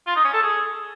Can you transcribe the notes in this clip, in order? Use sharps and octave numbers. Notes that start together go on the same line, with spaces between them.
F4
D#4
C#4
A4
G#4